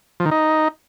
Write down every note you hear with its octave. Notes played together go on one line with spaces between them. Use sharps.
F3
D#3
D#4